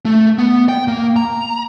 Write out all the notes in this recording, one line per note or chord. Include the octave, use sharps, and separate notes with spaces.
A3
B3
G5
A#3
A#5